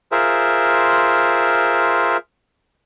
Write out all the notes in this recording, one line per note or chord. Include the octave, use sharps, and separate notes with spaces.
F4 G#4 A#4 C5 E5